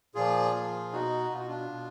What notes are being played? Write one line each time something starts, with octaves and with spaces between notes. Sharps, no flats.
A#2 F3 F4 G#4
A#2
F3
B2 D#4 F#4
B2 F4
F#4
D4 F4
B2